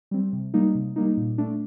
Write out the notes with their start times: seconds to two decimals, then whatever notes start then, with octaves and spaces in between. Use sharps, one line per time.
0.11 G3 C4
0.33 C3
0.54 G3 A#3 D#4
0.75 C3
0.96 G3 A#3 D#4
1.17 A#2
1.38 A3 D4